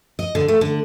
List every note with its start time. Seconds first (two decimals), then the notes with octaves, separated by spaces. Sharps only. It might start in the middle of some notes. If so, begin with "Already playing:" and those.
0.19 D#5
0.35 D3
0.48 A3
0.61 D3